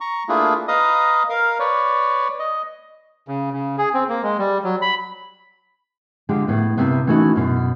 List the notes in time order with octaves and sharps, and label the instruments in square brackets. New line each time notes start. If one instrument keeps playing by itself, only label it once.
[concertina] A#5 C#6
A3 A#3 D4 E4 F4 G#4
B4 D#5 F5 A#5 D#6
A#4 F5
B4 C#5 D5
D#5
[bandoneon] C#3
C#3
G#4
C4
A#3
G#3
G3
F#3
B5
[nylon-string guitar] D3 F3 G#3 G4
A2 B3
G2 C3 B3
E3 A3 C#4 D#4 F#4
F#2 B2